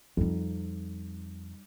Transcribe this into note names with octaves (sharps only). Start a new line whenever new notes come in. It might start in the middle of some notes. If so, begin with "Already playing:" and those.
F2 G3 D#4